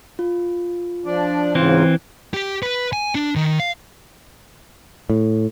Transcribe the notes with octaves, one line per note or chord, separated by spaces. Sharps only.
F4
F3 D4 D5
G#2 C#3 E3 C4 F4
G4
B4
G#5
D4
D#3
F5
A2